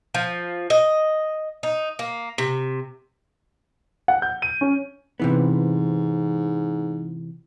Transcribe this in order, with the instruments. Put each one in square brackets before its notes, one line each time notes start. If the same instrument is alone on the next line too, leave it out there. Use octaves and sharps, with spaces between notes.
[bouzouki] F3
D#5
D#4
A#3
C3
[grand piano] F#5
G6
D#7
C#4
[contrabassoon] G#2 [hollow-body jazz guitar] C3 E3 B3